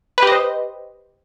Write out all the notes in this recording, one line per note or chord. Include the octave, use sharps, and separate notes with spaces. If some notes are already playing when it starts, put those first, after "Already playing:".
G4 B4 C5 D#5